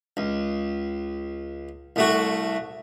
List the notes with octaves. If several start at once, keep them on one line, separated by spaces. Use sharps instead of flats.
C#2
C2 A3 F#4